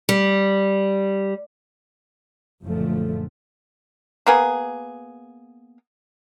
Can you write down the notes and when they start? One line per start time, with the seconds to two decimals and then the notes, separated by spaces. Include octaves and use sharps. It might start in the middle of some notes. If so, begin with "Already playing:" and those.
0.09 G3
2.64 F#1 F#2 A#2 D3 F3 A3
4.27 A#3 B3 G#4